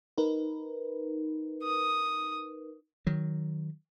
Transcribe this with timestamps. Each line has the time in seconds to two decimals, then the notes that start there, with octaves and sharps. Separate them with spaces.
0.18 D#4 A#4 B4
1.63 D#6
3.07 D#3 F#3